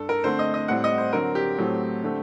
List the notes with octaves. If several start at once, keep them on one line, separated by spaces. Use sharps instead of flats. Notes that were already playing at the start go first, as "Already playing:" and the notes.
Already playing: G2 A4
A#4
D3 A3 C4 C5
D#5
D#5
A2 G3 C4 F#5
D#5
C5
D3 F#3 C4 A#4
G4
A2 F#3 A3 C4
D3 A3 C4